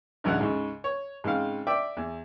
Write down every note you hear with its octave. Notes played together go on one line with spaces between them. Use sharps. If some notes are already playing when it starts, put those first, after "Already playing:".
A1 D2 F#3 G#3 D#4 F#5
G#2 C#3
C#5
G#2 C#3 C4 F5
D5 E5 G5 D6
E2